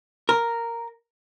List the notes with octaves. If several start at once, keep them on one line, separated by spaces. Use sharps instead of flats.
A#4